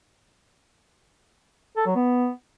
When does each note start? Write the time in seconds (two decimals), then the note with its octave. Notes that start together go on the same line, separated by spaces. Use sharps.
1.77 A4
1.86 F#3
1.96 B3